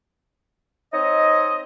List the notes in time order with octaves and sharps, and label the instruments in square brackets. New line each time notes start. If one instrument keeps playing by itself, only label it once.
[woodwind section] C4 D#4 C#5 D#5